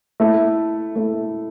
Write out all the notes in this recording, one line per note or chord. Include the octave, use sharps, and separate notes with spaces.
A3 E4 A4
A3 E4 A4